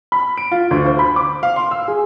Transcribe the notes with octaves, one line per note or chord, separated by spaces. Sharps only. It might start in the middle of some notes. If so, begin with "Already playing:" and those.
B5
D7
F4
D2
C5
B5
D6
F5
C6
E6
G#4